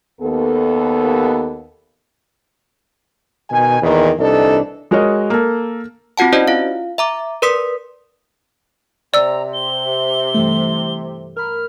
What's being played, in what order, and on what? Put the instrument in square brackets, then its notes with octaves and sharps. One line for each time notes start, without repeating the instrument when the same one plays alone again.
[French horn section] D#2 B3 A4
[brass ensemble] B2 D#3 G#5
E2 A#2 D#3
C2 E3 D4 D#4 A4
[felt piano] G#3 F#4 A#4 C#5 D#5
A#3 A4
[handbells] C4 F4 F#4 F#5 A5
C#4 E4 F#4 C5 D5 D#5
F4 F5
E5 A#5 D6
A#4 B4 D5 C6 D#6 B6
[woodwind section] C3 [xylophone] D5 E6 [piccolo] A#5
[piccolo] G7
[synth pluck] G2 E3 A3
[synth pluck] A#4 B5 [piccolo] F6